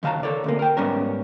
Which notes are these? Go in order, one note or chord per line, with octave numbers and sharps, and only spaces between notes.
D#2 C#3 F5 A5 A#5
A4 C#5 D5
D2 C3 A#3
A#4 G5
G#2 G3 B3 C#4 A#4